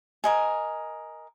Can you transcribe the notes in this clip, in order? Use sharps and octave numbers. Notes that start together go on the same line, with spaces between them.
A#4 D#5 G#5